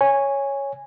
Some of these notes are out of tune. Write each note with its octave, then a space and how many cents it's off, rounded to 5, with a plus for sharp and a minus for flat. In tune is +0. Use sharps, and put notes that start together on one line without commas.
C#5 +0 G#5 -10